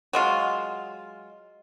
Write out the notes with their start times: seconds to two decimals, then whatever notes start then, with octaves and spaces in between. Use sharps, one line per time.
0.13 F#3 G#3 F4